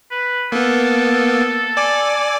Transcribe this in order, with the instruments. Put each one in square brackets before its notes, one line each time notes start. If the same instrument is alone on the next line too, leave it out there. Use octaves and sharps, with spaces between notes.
[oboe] B4
[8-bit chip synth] A#3 B3 [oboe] A4
[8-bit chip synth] D5 G#5 D6